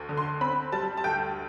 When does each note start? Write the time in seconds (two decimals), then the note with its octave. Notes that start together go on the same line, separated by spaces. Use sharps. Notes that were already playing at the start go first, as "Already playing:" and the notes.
Already playing: D2
0.09 D3
0.17 C6
0.41 C4 B5
0.72 G3 A5
0.97 A5
1.04 D2 G5